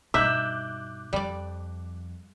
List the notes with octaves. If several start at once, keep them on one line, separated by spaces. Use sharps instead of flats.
G2 B2 D#4 E5 D6 F#6 G6
F2 G3 D5